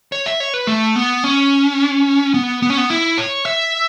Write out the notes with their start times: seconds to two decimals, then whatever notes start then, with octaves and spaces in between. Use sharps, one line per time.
0.12 C#5
0.26 E5
0.40 C#5
0.54 B4
0.67 A3
0.96 B3
1.24 C#4
2.34 B3
2.62 B3
2.70 C#4
2.78 B3
2.90 E4
3.18 C#5
3.45 E5